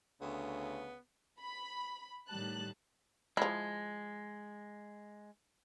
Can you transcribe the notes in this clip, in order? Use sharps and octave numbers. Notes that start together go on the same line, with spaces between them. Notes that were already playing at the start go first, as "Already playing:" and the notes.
D2 C#3 B3
B5
A2 D#3 G3 A5 F#6
F3 G#3 E4